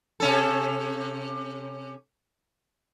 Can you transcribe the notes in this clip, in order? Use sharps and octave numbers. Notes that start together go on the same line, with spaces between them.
C3 C#4 A4